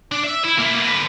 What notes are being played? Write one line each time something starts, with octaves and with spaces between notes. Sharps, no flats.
D4
E5
E4
A#3 E4
A#3 B3
D3 B4